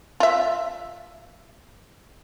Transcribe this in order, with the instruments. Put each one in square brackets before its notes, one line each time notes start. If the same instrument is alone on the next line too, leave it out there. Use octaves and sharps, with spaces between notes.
[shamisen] F4 E5